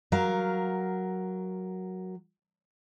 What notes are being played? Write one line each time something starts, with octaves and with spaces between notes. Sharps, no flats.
F#3 A#4 F5